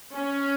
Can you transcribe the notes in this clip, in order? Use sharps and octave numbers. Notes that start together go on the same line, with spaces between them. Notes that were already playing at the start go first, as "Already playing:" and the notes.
C#4